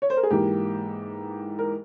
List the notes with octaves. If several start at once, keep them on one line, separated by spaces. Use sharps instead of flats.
C#5
C5
A#4
G#4
G#2 E3 A#3 G4
A#4